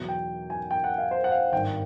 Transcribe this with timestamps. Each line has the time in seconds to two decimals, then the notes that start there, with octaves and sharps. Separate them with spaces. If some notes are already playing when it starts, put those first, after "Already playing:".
Already playing: E2 B2 F#3
0.09 G5
0.50 G#5
0.71 G5
0.84 F#5
0.98 F5
1.11 C5
1.24 F#5
1.32 F5
1.52 G#1 G2 D#3 G5